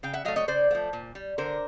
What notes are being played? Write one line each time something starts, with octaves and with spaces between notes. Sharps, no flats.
C#3 F5 G5
E5 F#5
F#3 A3 D#5 F5
C#5 D#5
C#3 C5 D5
F3 A3
A#2
G3
D3 A#4 C5